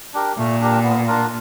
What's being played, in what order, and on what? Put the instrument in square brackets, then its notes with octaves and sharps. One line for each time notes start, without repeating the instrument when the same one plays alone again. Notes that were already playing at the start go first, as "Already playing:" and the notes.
[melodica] D4 G4 A#4
[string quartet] A#2 [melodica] A3
[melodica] D4 G4 A#4
B3
D4 F4 A#4